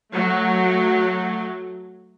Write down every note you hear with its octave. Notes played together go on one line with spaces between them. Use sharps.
F#3 A3